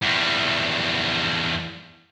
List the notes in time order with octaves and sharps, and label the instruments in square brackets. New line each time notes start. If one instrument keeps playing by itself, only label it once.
[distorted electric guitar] E2 G3